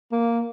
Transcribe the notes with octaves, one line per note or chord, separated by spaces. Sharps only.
A#3